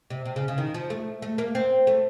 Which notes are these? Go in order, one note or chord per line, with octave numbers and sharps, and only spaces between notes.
C3
C3
C#3
C#3
D#3
F3
A3
A3
A#3
C4
A3